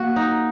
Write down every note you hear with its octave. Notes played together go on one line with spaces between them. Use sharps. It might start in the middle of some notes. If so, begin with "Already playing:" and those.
Already playing: A#3 F#4
D#4